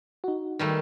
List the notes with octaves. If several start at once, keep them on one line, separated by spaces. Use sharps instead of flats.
D#4 F#4
D#3 G3 A3